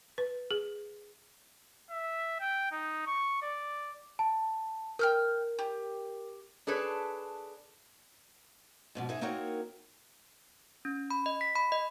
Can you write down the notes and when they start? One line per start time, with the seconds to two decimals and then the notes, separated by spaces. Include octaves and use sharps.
0.18 B4
0.51 G#4
1.91 E5
2.40 G5
2.72 D#4
3.07 C#6
3.42 D5
4.19 A5
4.99 A#4 G5 F6 G6
5.59 G4
6.67 D4 G#4 A4 B4 C#5
8.95 G#2 B2 F3
9.09 G#2 G#3 D#4 G#4 E5 G#5
9.21 A#3 C4 D#4 F#4 A#4 C#5
10.85 C#4
11.11 B5
11.26 D#5
11.41 B6
11.56 B5
11.72 D#5